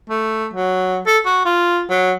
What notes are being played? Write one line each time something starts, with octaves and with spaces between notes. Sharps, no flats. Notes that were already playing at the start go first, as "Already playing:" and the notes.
A3
F#3
A4
F#4
F4
F#3